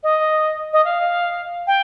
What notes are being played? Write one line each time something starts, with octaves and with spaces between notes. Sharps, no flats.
D#5
D#5
F5
G5